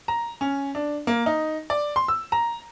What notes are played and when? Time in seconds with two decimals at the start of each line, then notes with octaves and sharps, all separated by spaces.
0.08 A#5
0.41 C#4
0.75 D4
1.07 A#3
1.26 D#4
1.70 D5
1.96 C6
2.08 E6
2.32 A#5